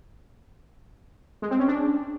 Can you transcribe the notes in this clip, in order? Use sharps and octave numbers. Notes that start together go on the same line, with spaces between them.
G#3
C4
C#4
D4